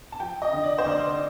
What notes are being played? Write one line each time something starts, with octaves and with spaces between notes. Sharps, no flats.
A5
F3 G5
D#5
D3
D5
C5
D2 D5